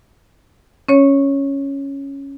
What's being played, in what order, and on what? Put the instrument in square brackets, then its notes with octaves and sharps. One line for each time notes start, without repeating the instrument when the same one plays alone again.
[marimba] C#4 C#5